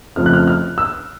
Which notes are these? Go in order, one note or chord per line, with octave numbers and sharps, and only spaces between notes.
F2 C#3 F3 A3 F6
F#6
F6
F6
E6